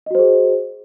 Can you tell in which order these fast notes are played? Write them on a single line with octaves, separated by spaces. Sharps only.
D#5 F#4 C5 G#4